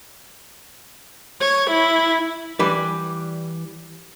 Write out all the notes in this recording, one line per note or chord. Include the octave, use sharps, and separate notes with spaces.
C#5
E4
E3 G3 B4